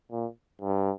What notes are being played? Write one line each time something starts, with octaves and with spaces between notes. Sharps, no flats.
A#2
G2